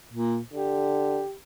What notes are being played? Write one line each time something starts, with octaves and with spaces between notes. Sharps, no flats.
A#2
D3 G4